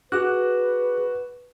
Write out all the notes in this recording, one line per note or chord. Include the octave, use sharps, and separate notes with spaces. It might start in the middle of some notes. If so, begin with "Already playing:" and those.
F#4 G#4 B4 D6 F#6